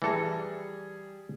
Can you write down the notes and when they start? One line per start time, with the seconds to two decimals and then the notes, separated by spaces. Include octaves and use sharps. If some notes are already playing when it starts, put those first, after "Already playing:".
0.02 E3 G3 G#4 A4 A#5